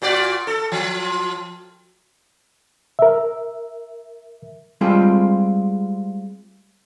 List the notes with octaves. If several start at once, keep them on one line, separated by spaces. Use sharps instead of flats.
A#2 F#4 D5
A4
F3
A#4 E5
G3 G#3 C4 F4 A4